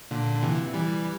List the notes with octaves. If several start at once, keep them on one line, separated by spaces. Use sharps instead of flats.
A#2 D3
D3
C3 E3
E3 G3